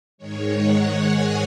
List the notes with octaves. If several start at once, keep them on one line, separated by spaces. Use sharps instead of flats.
G#2 D#3 G#3 C#5
F#5
G#5